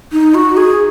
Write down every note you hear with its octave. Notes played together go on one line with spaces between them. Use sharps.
D#4
F#4
G#4